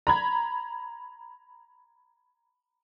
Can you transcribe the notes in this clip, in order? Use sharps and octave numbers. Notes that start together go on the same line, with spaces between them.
A#5 B5 G#6